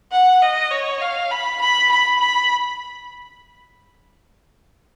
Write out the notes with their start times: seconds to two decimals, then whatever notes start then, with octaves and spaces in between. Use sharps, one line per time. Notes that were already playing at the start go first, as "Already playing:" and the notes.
0.11 F#5
0.42 D#5
0.71 C#5
1.01 F5
1.31 B5
1.61 B5
1.91 B5
2.20 B5